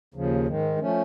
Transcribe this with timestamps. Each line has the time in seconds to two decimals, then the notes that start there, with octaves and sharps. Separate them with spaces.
0.14 D#2 C#3 F3
0.47 G#2 D#3 G#3
0.80 F3 A3 C#4